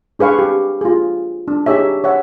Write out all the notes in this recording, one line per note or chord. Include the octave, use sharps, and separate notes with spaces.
D4 G#4 B4 F5 C#6
G4
F4 G#4
D4
D#4 G4 G#4 C#5 E5
C#5 E5 F#5